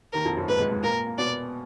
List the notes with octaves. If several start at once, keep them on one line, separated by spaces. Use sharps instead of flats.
D#2 D#3 A#4
F2 F3
F#2 F#3
G#2 G#3 B4
G#2 G#3
G#2 G#3
A#2 A#3 A#4
A#3
B2 B3 D5